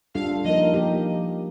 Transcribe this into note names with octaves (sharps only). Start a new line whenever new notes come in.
G3 D4 F4 A4 F5
F3 A#3 D#4 A#4 D#5
F3 A#3 D#4 G4